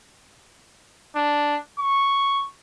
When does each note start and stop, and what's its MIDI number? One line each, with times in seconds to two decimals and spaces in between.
1.16 1.57 62
1.79 2.47 85